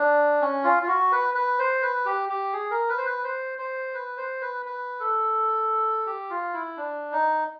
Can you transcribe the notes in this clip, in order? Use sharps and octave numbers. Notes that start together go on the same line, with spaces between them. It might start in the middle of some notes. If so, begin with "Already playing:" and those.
Already playing: D4
C#4
F4
F4
F#4
B4
B4
C5
B4
G4
G4
G#4
A#4
B4
C5
B4
C5
C5
B4
C5
B4
B4
A4
G4
F4
E4
D4
D#4